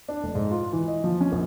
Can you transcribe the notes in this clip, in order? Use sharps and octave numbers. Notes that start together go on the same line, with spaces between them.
D4
F1
G#2
F4
E3
D#5
F3
C#4
A#1